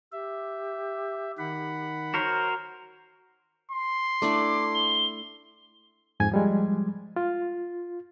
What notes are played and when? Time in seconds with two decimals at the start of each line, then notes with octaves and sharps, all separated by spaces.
0.12 G4 E5
1.39 D#3 F#5 B5
2.14 F#4 A#4 C5 C#5
3.72 C6
4.22 A3 D4 E4 D6
4.74 G7
6.20 F2 G#2 G#5 G#6
6.31 F3 G3 G#3
7.16 F4